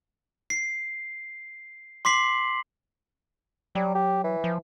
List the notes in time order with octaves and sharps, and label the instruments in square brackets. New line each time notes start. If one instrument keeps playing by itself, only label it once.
[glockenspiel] C7
C6 D6 B6 C7 F#7
[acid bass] F#3 [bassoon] G3
[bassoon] G4
E3
[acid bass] F3